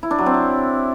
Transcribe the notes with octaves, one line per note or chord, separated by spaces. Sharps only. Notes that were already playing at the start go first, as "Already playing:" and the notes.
E4
D4
F#3
C4
E4